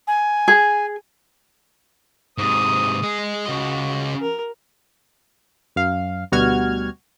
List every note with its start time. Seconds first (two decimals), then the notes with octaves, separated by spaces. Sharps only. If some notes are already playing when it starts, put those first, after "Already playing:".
0.07 G#5
0.48 G#4
2.38 G#2 C3 D#6
3.03 G#3 G#4
3.46 C#3 F#4 D#5
4.22 A#4
5.76 F#2 F5
6.32 D2 B2 G3 F#4 F6 G#6